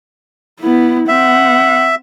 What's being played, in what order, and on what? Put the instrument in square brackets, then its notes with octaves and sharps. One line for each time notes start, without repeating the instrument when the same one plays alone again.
[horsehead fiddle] B3 E4
[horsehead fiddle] C4 F#5 [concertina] E5